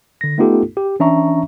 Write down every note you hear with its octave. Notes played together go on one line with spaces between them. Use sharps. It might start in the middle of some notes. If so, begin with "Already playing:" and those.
D3 A#6
A3 B3 D#4 F4 G4 A4
G4
E3 C#4 D4 E5 A#5 C#6